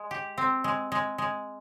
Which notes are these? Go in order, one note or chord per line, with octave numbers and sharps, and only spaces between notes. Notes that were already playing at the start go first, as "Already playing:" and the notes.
Already playing: G#3
G4
C4
G#3
G#3
G#3